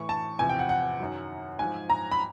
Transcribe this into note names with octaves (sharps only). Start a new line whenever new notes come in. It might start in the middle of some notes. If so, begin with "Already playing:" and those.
Already playing: A2 E3 C#6
A5
E2 C3 F3 G#5
G5
F#5
F#5
F#2 D#3 F#3
G#2 F3 G#5
A#5
B5